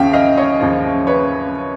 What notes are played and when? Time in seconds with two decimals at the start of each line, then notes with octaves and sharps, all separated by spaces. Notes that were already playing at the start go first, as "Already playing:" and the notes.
Already playing: D#2 C#3 F3 E5 F5 G5
0.13 D#5 F5
0.37 C#5 D#5
0.60 D#2 C#3 F3
1.07 B4 C#5